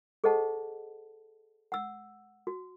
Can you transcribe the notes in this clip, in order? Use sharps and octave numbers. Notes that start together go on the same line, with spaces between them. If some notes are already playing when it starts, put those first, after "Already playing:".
G#4 A4 C5 D#5 F#5 A5
F#5 E6
F#4